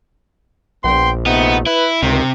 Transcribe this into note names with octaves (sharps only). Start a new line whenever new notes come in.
A#1 B3 G5 C6
C3 A3 B3 D#4
E4 B4
C#2 G2 C3 D#3